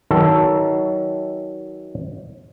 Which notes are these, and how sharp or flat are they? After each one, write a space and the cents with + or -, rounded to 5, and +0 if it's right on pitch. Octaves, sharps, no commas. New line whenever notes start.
D#3 +35 F#3 +25 A4 +0